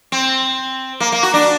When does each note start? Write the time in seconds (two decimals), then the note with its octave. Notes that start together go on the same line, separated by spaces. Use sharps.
0.12 C4
1.00 A#3
1.12 A#3
1.23 F#4
1.34 D4